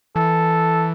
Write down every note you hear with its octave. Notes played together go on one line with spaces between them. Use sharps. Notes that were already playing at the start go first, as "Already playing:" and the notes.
E3 A4